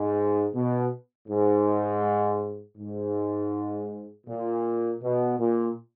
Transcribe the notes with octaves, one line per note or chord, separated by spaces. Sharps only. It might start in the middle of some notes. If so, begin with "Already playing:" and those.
Already playing: G#2
B2
G#2
G#2
A#2
B2
A#2